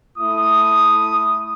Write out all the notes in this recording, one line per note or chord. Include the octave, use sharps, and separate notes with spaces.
A3 E4 D#6